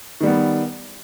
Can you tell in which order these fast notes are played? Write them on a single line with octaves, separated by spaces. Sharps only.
D#3 G3 B3